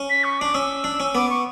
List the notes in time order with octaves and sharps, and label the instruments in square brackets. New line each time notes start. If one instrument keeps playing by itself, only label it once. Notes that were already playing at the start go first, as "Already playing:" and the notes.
Already playing: [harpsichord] C#4
[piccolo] B6
C#6
[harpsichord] D4 [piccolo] D6
[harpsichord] C#4 [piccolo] E6
[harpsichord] D4
C#4
[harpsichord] B3 [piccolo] D6
[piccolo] C#6